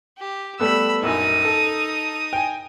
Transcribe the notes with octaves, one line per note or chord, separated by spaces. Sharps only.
G4
G3 A3 B3 B5 E6
A#1 F#2 D#4 G#5 D#6
A4
G5 G#5